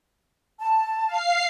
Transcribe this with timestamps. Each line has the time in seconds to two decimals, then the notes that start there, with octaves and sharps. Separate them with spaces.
0.59 A5
1.07 F5 C7